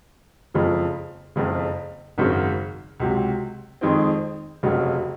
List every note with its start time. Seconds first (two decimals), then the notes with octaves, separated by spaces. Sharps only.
0.54 F#1 F2 C#3 F3
1.36 F#1 F2 C#3
2.18 G#1 F#2 C#3 F#3 C4
3.00 C#2 C3 F#3
3.81 F2 D#3 G#3 C4 D#4
4.63 F1 F2 C#3 F#3